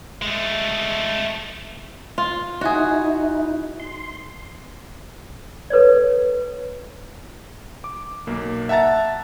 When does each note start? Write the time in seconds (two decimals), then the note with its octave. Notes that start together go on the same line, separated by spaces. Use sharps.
0.22 G#3 A3
2.18 F4
2.61 D#4 E4 F#4 G#4
3.80 C6
5.70 A4 B4 C#5 D5
7.84 D6
8.27 B1 A#3
8.69 E5 F#5 A5 A#5 A6